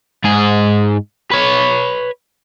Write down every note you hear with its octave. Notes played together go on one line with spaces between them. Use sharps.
G#2 G#4
B4 C#5